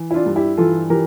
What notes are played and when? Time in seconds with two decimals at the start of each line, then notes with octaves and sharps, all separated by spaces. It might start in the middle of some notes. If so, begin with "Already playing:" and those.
Already playing: E3
0.11 E4
0.14 D4 F4
0.26 G2
0.36 E4 G4
0.57 E3 F4 A4
0.90 E3 G4 A#4